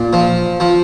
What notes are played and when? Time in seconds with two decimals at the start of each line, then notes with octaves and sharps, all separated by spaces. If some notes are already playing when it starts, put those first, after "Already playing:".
Already playing: A#2
0.13 F3
0.60 F3